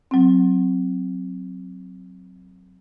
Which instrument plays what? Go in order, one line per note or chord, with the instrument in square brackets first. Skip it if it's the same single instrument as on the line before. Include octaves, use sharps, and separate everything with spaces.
[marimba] F#3 C4